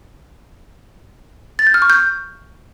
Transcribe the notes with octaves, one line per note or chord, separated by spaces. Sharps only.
A6
G6
F6
C#6
G6